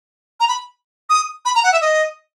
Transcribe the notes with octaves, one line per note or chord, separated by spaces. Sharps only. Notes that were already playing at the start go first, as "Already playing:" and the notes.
A#5
B5
D#6
B5
A#5
F#5
E5
D#5